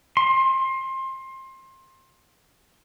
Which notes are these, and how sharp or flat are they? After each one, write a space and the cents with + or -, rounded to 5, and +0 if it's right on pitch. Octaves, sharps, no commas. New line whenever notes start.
C6 +25